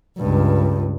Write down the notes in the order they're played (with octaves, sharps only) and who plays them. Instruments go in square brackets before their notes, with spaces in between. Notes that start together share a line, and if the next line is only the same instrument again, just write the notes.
[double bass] C#2 G2